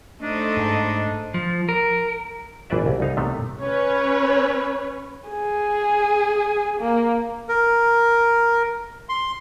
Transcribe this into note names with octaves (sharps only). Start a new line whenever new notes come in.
A3 D4 D#4 A4 C5 D#5
G#2
F3
A#4
G#1 E3 D4 B4 D5 E5
C2
C2 D#4 F5
C3 D#3 A3 B3
C#4 B4 C#5
G#4
A#3
A#4
C6